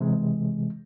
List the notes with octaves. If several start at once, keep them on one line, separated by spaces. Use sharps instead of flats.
C3 E3 G#3